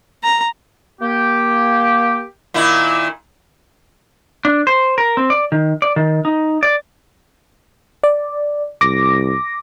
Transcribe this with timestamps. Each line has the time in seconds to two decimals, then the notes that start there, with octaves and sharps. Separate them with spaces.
0.23 A#5
1.02 A#3 G4
2.54 A#2 D#3 E4
4.45 D4
4.67 C5
4.98 A#4
5.17 C4
5.30 D5
5.52 D#3
5.82 D5
5.96 D#3
6.25 D#4
6.63 D5
8.03 D5
8.81 C2 D6 A#6